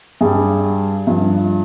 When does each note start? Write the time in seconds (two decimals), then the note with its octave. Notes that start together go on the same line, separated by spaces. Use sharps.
0.21 G2 G3 G#4
1.07 G2 F3